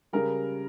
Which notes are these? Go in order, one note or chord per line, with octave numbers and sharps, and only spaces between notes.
C#3 G3 A#4